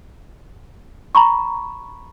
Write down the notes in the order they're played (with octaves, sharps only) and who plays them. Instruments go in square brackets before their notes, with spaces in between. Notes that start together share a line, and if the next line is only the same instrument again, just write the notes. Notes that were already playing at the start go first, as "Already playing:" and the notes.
[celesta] A#5 B5 C#6